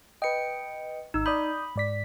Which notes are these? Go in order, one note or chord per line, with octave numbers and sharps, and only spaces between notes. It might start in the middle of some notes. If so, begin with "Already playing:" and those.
B4 D#5 G5 C#7
G#1 D#4 E6
D5 B5 D#6 G6
G#2 D5 B6